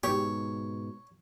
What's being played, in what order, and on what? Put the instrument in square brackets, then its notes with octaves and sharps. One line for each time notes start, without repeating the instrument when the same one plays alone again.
[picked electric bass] G#2 B2 [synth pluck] G4 [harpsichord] C#5